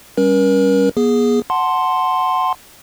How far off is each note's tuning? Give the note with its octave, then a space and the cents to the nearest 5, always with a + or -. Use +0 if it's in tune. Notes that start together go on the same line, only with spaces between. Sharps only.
G3 +0 C#4 +0 A#4 +40
B3 -45 G#4 +0
F#5 +0 A5 +0 C6 +0